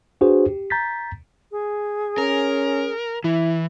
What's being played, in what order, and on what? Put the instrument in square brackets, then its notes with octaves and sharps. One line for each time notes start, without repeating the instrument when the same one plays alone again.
[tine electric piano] D4 F#4 G#4 B4 C5
G4
A#5 G6 A6 B6
[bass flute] G#4
[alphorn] C#4 [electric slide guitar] A#4
[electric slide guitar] E3 [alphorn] E4